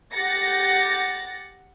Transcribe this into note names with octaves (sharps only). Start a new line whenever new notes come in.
G4 F#5 A6 A#6 C#7